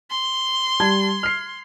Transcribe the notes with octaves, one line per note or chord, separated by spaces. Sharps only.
C6
G3 A5 G#6
F6 C7